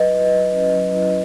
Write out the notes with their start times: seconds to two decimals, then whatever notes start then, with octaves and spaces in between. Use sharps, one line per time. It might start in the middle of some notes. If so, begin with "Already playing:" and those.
Already playing: F#3 B4 D#5
0.10 E4
0.31 F#3
0.52 C#4
0.74 F#3
0.95 E4